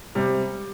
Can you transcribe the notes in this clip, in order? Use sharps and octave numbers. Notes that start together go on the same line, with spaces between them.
C3 G3